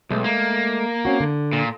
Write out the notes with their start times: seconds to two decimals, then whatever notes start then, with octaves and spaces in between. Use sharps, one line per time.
0.11 B1 G#3 A3
0.24 A#3
1.05 C4 C#4 F#4
1.20 D3
1.53 A#2